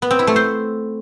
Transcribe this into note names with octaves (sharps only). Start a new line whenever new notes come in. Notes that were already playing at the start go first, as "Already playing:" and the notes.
B3
C4
E4
A3
C5